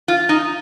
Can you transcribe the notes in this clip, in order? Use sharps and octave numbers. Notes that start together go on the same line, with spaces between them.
F4
D#4